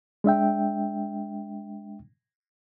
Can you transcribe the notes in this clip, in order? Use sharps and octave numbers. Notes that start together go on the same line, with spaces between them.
G#3 D4 E5 G5